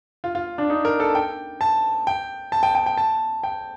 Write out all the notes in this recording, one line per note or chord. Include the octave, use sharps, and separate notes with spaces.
F4
F4
D4
D#4
A#4
A4
G5
A5
G5
A5
G5
G5
G5
A5
G5